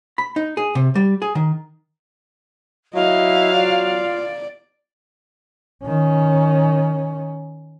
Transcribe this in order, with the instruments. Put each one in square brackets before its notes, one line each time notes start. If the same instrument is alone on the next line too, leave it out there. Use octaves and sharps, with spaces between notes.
[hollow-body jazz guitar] B5
D#4
G#4
C3
G3
G#4
D#3
[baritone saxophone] F#3 [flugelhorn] E4 [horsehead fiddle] D#5 [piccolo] F5
[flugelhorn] F4 [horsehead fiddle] D5
[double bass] D#3 C#4